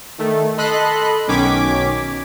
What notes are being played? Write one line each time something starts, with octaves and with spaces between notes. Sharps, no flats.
D#3 A3
A4 D#5 B5 C6 F#6
B1 D#3 C#4 D6 G#6 B6